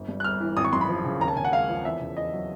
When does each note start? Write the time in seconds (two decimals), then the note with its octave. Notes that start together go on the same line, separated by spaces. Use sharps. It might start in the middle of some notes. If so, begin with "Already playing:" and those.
Already playing: G1
0.09 G2
0.20 F#6
0.24 G1 F6
0.41 E3
0.57 G#1 D#6
0.65 C#6
0.73 F#2 C6
0.81 B5
0.89 F3
1.04 C#3
1.20 D#2 A#5
1.28 A5
1.36 C#3 G#5
1.44 F#5
1.52 G#3 F5
1.69 F3
1.85 E2 E5
2.01 C#3
2.16 E2 D#5
2.33 F#3